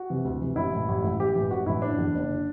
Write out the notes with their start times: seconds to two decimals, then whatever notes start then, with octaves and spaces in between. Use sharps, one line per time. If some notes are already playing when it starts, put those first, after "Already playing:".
Already playing: F#4
0.10 C3 E3
0.25 D2
0.41 C3 E3
0.56 A1 E4
0.72 A2 E3
0.88 A1
1.03 A2 E3
1.19 A1 G4
1.35 A2 E3
1.51 A1 F#4
1.66 A2 E3 E4
1.82 F#1 D4
1.98 E2 D3
2.14 F#1
2.29 D3